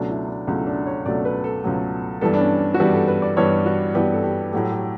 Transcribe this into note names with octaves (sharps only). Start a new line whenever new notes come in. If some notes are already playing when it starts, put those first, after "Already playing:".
Already playing: C#2 B2 F#3 A3 D4
E4
D4
C#2 B2 F#3 A3
E4
D4
C#5
C#2 B2 F#3 A3 D5
B4
A4
C#2 B2 F#3 A3
G2 E3 G3 B3 A4
D4
C#4
F#4
G2 E3 G3 B3 G4
A4
B4
D5
G2 E3 G3 B3 C#5
F#4
G2 E3 G3 B3 G4
A4
G4
A2 F#3 A3 G4
G4